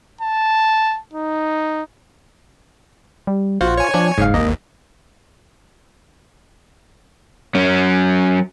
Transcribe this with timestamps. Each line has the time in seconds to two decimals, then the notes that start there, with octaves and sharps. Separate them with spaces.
0.21 A5
1.13 D#4
3.27 G3
3.61 A#1 F4 F#4 C5
3.78 C#5 G#5
3.94 F3 D4
4.18 F#1 G#2 F5
4.34 G#1 D#2 A#3 D#5
7.55 F#3 C#4